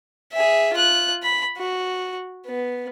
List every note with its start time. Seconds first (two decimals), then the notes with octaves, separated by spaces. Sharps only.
0.33 G#4 E5
0.74 F4 F#6
1.23 B5
1.58 F#4
2.47 B3